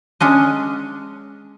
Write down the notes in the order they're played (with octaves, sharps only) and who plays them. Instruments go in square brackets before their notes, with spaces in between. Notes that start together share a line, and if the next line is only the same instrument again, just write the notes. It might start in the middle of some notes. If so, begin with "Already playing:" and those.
[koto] G#3 C#4 D4 D#5